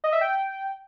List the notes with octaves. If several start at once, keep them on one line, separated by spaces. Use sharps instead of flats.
D#5
E5
G5